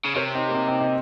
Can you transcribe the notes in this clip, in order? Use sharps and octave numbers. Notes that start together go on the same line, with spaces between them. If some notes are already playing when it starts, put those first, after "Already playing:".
C#3
C3 A#4 C#5
C4 D#4
A#3
C4
C4 D#4
C4 D#4